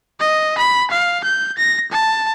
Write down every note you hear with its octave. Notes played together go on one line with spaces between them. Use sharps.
D#5
B5
F5
G6
A#6
A5